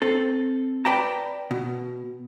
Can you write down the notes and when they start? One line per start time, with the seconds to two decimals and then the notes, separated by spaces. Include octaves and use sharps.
0.02 C4 A4
0.85 B4 D5 G5 A5 A#5
1.51 B2